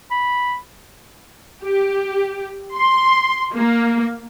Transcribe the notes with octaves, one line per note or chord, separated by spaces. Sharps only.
B5
G4
C6
A#3